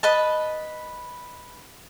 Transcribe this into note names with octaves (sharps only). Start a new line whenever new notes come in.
B4 D#5 A5